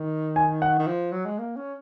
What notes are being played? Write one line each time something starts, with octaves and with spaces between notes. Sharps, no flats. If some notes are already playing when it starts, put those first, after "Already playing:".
Already playing: D#3
G#5
F#5
D#3
F3
F#3
G#3
A#3
C#4